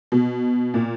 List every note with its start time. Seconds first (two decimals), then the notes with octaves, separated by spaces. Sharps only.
0.12 B2
0.74 A#2